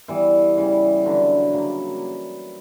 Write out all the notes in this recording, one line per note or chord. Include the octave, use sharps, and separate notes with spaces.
E3 G3 B3
C#3 E3 G3
D3 F#3 B3
C#3 F#3 A#3